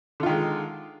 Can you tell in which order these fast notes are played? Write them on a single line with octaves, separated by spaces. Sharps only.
D3 F4 D#3 G#3